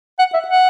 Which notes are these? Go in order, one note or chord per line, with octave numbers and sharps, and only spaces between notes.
F#5
E5
F#5